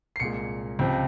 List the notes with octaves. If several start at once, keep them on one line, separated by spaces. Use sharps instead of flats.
C7
C2 A#2 G#3 C#7
C#2 C3 F3 C4